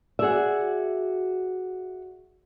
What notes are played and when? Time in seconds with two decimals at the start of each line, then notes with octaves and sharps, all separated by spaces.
0.19 F#4 G#4 D5 E5